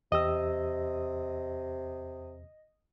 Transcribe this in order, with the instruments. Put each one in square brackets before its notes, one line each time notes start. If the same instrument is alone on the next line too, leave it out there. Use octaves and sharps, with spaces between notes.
[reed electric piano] E2 G4 E6 [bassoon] C3 [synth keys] D#5